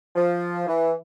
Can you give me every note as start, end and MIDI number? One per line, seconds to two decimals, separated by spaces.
0.16 0.66 53
0.67 0.93 52